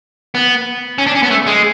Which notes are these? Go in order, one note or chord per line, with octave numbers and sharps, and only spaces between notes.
B3
C#4
D4
C#4
B3
A3
G#3